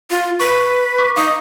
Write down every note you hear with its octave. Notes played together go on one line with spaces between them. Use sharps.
F4
B4 C#6
C#6 D6
D#4 F5 D#6